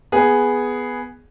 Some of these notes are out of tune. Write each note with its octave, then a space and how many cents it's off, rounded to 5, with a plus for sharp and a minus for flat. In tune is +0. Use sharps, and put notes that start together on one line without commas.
B3 +0 G#4 +0